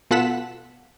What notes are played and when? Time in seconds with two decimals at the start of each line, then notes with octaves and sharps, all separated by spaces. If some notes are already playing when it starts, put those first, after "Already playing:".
0.11 B2 F4 A4 F#5 B6 E7